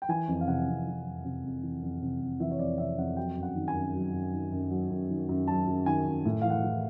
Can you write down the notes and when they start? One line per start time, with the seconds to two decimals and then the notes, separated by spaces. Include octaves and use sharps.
0.02 G5
0.09 E3 G#5
0.28 F2
0.41 F5
0.48 C3 F#5
0.68 F2
0.87 E3
1.05 F2
1.25 C3
1.44 F2
1.63 E3
1.82 F2
2.02 C3
2.21 F2
2.40 E3 E5
2.51 C#5
2.59 F2 D5
2.78 C3 E5
2.97 F2 F#5
3.17 F#3 G5
3.37 F#2
3.43 F#5
3.55 D#3
3.68 G#5
3.75 F#2
3.95 F#3
4.13 F#2
4.33 D#3
4.52 F#2
4.70 F#3
4.90 F#2
5.10 D#3
5.29 F#2
5.48 F#3 A5
5.67 F#2
5.86 D#3 G#5
6.06 F#2
6.25 A2
6.42 E3 F5
6.50 F#5
6.64 E3